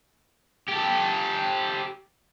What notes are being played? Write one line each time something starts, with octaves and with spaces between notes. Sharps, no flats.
G4 A4